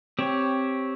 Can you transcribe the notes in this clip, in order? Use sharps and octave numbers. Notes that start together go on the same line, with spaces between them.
C4 G4 C#5